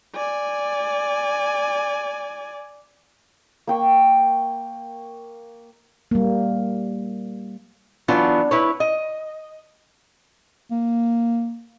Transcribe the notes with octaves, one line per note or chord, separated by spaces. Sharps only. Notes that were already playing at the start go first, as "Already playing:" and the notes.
D5 G#5
A#3 G5 C#6
G3 A#3
E3 F#3 B3 D4 F4
E4 B4 C#5
D#5
A#3